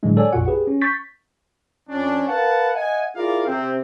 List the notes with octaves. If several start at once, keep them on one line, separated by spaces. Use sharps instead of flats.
A2 D3 E3 F#3 G#3 D4
A4 C#5 D5 G#5
A#1 F2 A#2 F4 F#4 F#5
G4 G#4 B4
C#4
C#6 G6 A6 B6
F2 C#4 D4
A#4 B4 F5 F#5 A5
D#5 E5 F#5 G#5
E4 F4 G#4 A#4 D5 F5
C3 C4